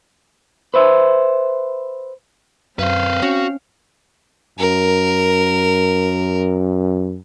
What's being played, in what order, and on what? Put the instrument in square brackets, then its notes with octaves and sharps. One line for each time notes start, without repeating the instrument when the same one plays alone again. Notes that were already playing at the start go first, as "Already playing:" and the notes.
[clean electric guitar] B4 C5 E5
[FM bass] F#2 [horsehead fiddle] C4 F5 [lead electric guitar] B4 C5
[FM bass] C#4 [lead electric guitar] F#4
[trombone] F#2 [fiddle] A#4